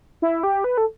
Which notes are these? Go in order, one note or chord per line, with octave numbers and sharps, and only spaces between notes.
E4
G4
B4
A4